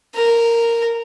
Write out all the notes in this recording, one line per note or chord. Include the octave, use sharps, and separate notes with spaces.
A#4